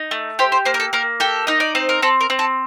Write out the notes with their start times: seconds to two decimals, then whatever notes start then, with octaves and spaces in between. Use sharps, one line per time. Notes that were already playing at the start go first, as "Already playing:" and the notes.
Already playing: D#4
0.11 A3
0.39 G4 C5
0.52 C5
0.65 A#3 C5
0.74 A#4
0.80 A4
0.93 A#3 A#4
1.20 G4 A4
1.47 D#4 D#5
1.60 D5
1.75 C4 C5
1.89 A#4
2.02 C4 A4
2.21 A#4
2.30 C4
2.39 A4